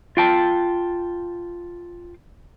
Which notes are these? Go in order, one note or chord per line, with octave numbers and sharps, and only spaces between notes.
F4 G5 A5